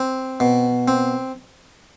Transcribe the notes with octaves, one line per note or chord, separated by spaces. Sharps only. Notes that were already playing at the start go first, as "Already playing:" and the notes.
Already playing: C4
B2
C4